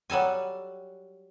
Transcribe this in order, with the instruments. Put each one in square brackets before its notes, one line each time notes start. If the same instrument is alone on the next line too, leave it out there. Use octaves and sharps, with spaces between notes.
[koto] F#3 G3 A4 G#5